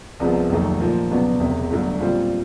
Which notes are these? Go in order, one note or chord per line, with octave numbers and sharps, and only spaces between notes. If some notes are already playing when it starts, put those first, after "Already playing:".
C2 C3 F3 G#3 B3
F1 D#2 D#3 F#3 A3
A#2 F3 A#3
C#2 B2 F#3 B3 D4
E1 E2 C3
G1 G2 D3 F#3 A3
A#2 G3 C4 F4